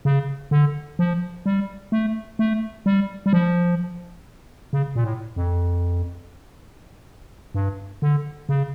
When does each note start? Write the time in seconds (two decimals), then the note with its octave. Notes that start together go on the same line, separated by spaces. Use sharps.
0.05 C#3
0.51 D3
0.99 F3
1.46 G3
1.92 A3
2.39 A3
2.86 G3
3.26 G3
3.33 F3
4.73 C#3
4.96 A#2
5.04 A2
5.36 F2
7.54 G2
8.02 D3
8.49 C#3